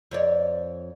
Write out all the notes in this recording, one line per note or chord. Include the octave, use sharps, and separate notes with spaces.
F2 C#5 D5